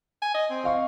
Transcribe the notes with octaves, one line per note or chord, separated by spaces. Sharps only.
G#5
D#5
C4
D#5 F5 C#6